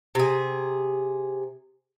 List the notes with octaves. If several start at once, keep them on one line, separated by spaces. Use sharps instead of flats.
C3 G#4